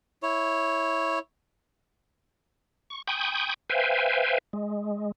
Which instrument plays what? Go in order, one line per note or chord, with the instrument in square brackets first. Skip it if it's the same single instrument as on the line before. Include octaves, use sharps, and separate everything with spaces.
[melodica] E4 C#5
[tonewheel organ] C#6
G5 G#5 B5 C#6 D#6 G6
B4 C5 E5 F5 G5 G#5
G#3